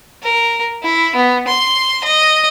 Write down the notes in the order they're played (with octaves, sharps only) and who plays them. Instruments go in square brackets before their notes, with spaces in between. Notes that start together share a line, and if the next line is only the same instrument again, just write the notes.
[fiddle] A#4
E4
B3
C6
D#5